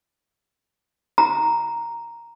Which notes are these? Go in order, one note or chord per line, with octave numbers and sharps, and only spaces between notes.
A#5